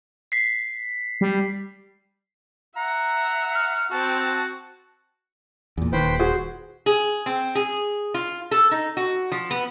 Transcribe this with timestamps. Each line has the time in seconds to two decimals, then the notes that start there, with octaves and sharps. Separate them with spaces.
0.32 B6 C7
1.21 G3
2.77 E5 F#5 A#5
3.55 F6
3.91 C4 F#4 A5
5.78 E2 A#2
5.93 D#1 D#2 B4 C5 G5
6.19 F#4 G#4 C5
6.86 G#4
7.26 C4
7.55 G#4
8.14 F4
8.51 A4
8.71 D#4
8.97 F#4
9.32 F3
9.51 B3